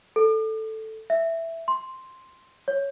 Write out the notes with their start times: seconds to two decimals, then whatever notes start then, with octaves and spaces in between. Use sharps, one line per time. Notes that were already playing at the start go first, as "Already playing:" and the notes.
0.16 A4
1.10 E5
1.68 C6
2.68 C#5